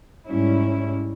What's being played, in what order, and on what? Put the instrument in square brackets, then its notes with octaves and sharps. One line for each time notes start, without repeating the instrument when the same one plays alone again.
[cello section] G#2 G3 C#4 E4